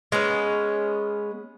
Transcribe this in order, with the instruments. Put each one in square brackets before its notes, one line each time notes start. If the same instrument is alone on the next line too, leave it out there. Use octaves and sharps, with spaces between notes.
[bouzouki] G#3 B3 C#4